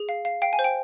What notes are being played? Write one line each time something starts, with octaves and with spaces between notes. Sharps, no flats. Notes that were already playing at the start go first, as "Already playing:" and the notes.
Already playing: G#4
F5
F5
F5 G5
G#5
C5
G5